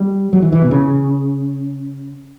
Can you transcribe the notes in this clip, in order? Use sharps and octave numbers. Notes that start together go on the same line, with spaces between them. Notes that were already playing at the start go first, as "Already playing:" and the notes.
Already playing: G3
F#3
E3
E3
B2
C#3